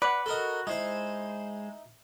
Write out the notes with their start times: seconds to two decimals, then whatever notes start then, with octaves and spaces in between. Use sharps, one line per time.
0.02 B4 D5 F#5
0.26 F#4 A4 A#4 D#5
0.67 G#3 D#4 E4 C5 D#5